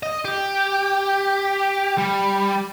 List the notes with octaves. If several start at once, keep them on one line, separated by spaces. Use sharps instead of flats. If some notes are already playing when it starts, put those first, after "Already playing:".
D#5
G4
G3